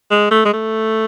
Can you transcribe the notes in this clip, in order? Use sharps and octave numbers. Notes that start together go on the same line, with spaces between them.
G#3
A3
G#3
A3